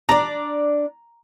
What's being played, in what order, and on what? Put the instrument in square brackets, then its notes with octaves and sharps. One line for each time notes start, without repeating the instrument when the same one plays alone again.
[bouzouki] D4 D5 [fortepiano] A#5